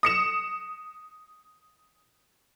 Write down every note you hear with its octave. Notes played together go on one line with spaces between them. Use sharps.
D#6 C#7 E7